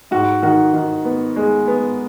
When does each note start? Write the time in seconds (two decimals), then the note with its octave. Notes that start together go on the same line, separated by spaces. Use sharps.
0.11 G#2 F#4
0.42 D#3 F#4
0.74 D#3
1.05 B3
1.36 G#3
1.68 B3